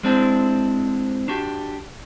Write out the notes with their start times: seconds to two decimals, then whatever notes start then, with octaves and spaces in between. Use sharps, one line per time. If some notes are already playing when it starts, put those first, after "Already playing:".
0.03 G#3 C4 D4 E4
1.28 D4 F#4 G4